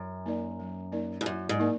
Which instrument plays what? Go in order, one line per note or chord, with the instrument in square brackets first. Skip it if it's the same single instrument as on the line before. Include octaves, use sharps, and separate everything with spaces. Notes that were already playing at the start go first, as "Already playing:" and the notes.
Already playing: [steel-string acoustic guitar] F#2
[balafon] A#3 D#4 A#4 D5
F#3
A#3 D#4 A#4 D5
[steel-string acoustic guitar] G#2
[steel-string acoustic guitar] F#2 [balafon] F#3
[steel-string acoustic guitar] G#2
[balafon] A#3 D#4 A#4 D5